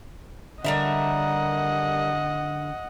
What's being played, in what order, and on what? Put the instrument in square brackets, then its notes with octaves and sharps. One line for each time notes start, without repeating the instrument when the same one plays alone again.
[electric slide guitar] D3 [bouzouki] G3 A#4 E5 [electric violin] D#5 F#5